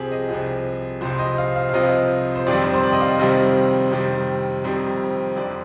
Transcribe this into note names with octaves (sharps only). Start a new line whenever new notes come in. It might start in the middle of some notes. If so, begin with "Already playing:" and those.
Already playing: C2 C3 F3 G4 G#4
D#5
C2 C3 F3
C2 C3 F3 C5
D#5
F5
F5
F5
C2 C3 F3 D#5
C5
F2 C3 D#3 G3 D5
C5
C5
D5
D#5
F5
F2 C3 D#3 G3 D#5
F2 C3 D#3 G3
F2 C3 D#3 G3
F2 D3 F3 D5